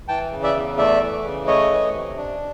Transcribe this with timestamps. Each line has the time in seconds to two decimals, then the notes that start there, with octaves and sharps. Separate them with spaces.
0.08 E3 G5 A5
0.31 C#3
0.43 D5 E5
0.55 E2
0.77 A3 D5 E5
1.01 E3
1.24 C#3
1.47 A3 C#5 D#5
1.70 E3
1.94 C3
2.17 D4